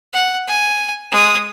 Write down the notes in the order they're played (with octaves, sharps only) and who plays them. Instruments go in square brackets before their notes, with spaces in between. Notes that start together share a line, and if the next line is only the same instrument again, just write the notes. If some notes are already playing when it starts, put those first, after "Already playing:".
[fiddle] F#5
G#5
G#3 D#6